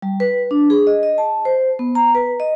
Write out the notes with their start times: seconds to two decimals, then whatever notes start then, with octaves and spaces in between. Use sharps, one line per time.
0.02 G3
0.20 B4
0.51 D4
0.70 G#4
0.87 D#5
1.03 D#5
1.18 A5
1.45 C5
1.79 B3
1.95 A#5
2.15 B4
2.40 D#5